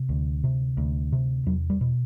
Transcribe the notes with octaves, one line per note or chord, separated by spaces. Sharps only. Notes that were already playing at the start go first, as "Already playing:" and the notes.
Already playing: C3
D2
C3
D2
C3
E2 F#3
G3
B2